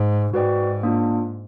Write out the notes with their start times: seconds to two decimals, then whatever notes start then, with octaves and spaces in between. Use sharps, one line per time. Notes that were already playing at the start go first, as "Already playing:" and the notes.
Already playing: G#2
0.34 G#2 F#4 B4 D5 G5
0.83 A#3 D4 F4